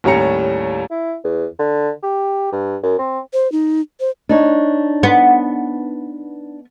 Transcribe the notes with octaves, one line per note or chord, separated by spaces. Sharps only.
D#2 A2 G3 C#4 A#5 C#7
E4
E2
D3
G4
G2
F#2
C4
C5
D#4
C5
D4 D#4 C#5
B3